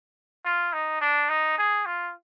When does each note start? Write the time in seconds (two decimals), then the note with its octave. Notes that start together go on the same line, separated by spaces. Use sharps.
0.45 F4
0.73 D#4
1.01 D4
1.29 D#4
1.58 G#4
1.86 F4